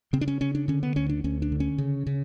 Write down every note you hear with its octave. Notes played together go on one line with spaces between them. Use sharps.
C#3 C4
D4
C#4
C#3 C#4
D4
D3 C#4
B3
D2 C#4
D4
D2 C#4
D4
D3
C#4
C#3
C#3